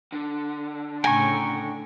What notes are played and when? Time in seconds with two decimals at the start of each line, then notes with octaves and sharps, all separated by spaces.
0.12 D3
1.04 A2 C#3 G5 G#5 A#5 C#6